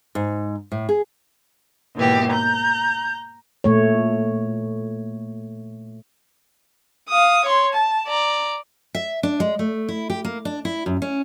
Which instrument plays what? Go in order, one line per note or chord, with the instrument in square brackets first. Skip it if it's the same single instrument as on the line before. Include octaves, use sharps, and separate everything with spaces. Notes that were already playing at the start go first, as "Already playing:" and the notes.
[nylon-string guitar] G#2
A2
G#4
[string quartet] D#2 G#2 B2 E3 G4
A#5 G6
[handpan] A#2 A3 C#5
[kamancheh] F5 D#6
C#5 C6
A5
D5 A#5
[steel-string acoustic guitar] E5
D4
G#3
A3
E4
G4
A#3
D4
E4
F#2
C#4